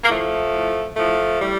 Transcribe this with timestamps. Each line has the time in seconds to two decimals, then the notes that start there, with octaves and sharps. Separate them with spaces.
0.04 A#3
0.09 A2 F3 A3
0.53 A2
0.97 A2 F3 A3
1.40 A2 G3